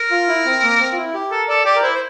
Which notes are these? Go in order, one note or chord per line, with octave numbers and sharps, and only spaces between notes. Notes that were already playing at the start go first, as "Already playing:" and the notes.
Already playing: A#4
F4
E4
C4
A#3
C4
F4
E4
G4
A4 A#4
A4 D5
G4 D5
A#4
E4 C5
C5